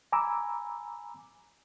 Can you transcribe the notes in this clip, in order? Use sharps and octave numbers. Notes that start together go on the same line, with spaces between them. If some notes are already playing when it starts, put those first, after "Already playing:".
G#5 A#5 B5 D6 E6